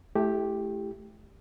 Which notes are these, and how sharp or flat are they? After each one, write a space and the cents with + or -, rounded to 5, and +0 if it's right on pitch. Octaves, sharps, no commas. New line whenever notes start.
A3 -25 E4 +10 G4 +0